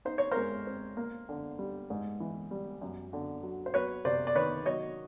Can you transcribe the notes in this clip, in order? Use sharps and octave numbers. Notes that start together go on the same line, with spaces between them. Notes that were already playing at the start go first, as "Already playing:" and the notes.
D#4 C5
C#5
A#4 C5
G#3
C4
A#3
D3
G3
G#2
E3
G3
F#2
D3
F#3
C5
F#3 B4 C#5
C3 C5 D5
D5
D#3 B4 C#5
F#3 C#5 D#5